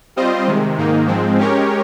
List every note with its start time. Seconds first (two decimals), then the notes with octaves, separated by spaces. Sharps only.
0.16 G3 C4 F4 C5 D#5
0.47 C3 D#3 G#3
0.77 G#2 D#3 A#3 D#4
1.07 G#2 F3 G#3 C4
1.38 G#3 C#4 G4 A#4 C#5